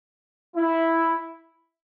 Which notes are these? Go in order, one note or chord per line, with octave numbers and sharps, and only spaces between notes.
E4